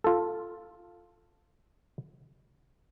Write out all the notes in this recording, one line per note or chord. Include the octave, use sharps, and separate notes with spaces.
F4 A4